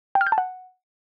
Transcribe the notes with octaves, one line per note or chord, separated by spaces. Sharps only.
G5
F6
G6
A5
F#5